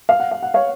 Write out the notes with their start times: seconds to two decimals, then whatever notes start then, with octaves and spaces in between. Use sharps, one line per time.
0.09 F5
0.20 F#5
0.31 F5
0.43 F#5
0.54 C#5 F5